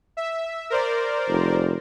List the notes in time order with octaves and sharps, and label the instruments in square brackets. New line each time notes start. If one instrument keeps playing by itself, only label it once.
[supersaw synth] E5
A#4 C5 D5
[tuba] F1